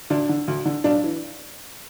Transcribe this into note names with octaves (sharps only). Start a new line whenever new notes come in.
D2 D4
D3
D2
D3
B1 D4
E3